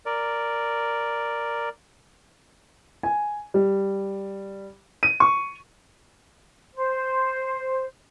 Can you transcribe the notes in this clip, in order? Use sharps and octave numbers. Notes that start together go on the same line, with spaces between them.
A#4 D5
G#5
G3
D#7
C#6
C5